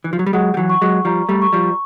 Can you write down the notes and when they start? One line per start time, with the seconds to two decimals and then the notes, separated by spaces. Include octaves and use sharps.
0.04 E3
0.13 F3
0.19 F#3
0.26 G3
0.33 F#3 G#3 F#5
0.54 G3
0.57 E3 F#3
0.70 C#6
0.82 F#3 G#3
1.05 F3 G3 A#5
1.29 G3 A3
1.42 C#6
1.53 F3 G3